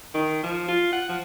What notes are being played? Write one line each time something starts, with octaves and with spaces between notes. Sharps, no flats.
D#3
F3
F4
F#5
F3